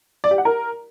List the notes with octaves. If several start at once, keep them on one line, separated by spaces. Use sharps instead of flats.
D5
G4
F#5
A#4